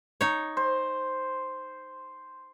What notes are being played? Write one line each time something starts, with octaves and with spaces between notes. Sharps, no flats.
D#4 C#5
C5